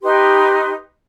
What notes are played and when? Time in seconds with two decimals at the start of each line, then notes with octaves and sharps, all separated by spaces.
0.03 D#4 G4 B4 C6